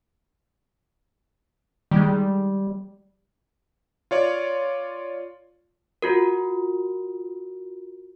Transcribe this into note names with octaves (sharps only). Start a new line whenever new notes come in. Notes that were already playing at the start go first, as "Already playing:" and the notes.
D#3 G3 G#3
F4 C#5 D5
F4 F#4 A#4